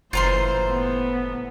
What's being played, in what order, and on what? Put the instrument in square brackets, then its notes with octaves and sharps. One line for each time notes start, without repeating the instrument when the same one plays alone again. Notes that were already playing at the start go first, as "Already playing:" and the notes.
[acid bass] F#1 [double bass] A2 E3 [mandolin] F4 A#5 C6 [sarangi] C5
[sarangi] B3